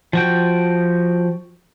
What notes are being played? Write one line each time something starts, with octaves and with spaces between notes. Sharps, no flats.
F3 F#4 G5